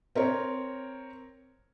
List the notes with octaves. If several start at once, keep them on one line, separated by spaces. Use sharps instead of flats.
C4 A#4 C#5